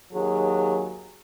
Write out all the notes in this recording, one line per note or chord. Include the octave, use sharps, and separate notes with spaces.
D#2 F#3 G#4